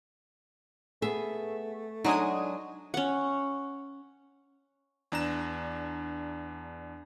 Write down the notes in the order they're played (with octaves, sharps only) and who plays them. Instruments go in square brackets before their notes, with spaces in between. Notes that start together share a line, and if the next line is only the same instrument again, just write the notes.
[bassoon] A3 [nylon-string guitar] B3 G#4 [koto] E5
[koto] F#3 G#3 [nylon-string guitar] D4 [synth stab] D#4 G#5 D#6
[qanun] C#4 F#5
[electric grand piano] E2 D4 A#5 E7